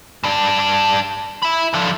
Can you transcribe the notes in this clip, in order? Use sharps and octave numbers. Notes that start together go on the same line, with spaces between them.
G2 D4
E5 B5
D3 F3